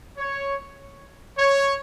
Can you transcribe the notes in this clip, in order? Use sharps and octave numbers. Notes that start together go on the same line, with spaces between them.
C#5
C#5